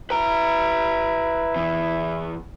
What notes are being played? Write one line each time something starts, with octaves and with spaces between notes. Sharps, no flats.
E4 B4 A#5
E2